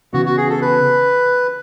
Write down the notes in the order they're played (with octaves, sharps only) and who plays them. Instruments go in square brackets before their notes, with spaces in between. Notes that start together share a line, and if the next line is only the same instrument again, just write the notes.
[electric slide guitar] C#3 E3 B3 [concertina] F#4
[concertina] F#4
G#4
A4
B4